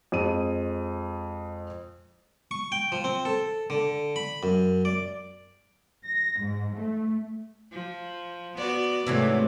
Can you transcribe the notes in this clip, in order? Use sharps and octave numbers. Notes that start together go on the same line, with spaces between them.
F2 G#3 D#7
C#6
G5
F3
C4
A4
D3
B5
F#2
D5
A#6
G#2
A3
F3
B3 F#4 D5
G#2 C3 E3 F#3 A3